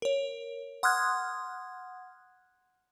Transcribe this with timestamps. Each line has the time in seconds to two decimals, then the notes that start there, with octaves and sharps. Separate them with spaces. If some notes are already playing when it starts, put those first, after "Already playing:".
0.02 A#4 C#5
0.83 F#5 C6 D#6 F6 F#6 G#6